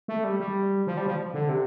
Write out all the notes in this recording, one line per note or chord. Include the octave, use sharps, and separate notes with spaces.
A3
G3
G3
F3
G3
F3
D3
C3